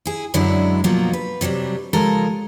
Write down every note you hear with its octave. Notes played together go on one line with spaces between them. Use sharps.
E4 G#4
F#2 D3 F#3 G#3 D4 E4
B2 F3 F#3 A#3 F4
B4
C3 F#3 G3 D4
C#3 F3 G#3 A4 A#4